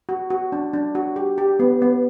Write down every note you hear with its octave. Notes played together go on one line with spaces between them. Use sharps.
F#4
F#4
D4
D4
F#4
G4
G4
B3
B3